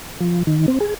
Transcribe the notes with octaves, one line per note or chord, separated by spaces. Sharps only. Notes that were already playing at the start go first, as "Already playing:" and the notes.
F3
D#3
C4
G#4